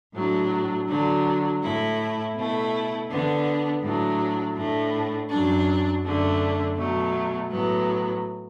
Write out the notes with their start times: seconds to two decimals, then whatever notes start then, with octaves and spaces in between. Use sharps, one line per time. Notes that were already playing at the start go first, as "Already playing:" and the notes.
0.14 A2 F#3 D4
0.88 D3 F#3 D4
1.62 A2 A3 E4
2.35 B2 A3 E4
3.09 D3 B3 D4
3.82 A2 F#3 D4
4.55 A2 A3 D4
5.29 F#2 F#3 D4
6.03 F#2 D3 A3 D4
6.76 B2 F#3 A3
7.50 A2 F#3 B3